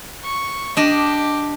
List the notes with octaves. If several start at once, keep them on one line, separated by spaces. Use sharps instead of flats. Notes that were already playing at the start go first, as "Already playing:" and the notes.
C#6
D4 G4 D#5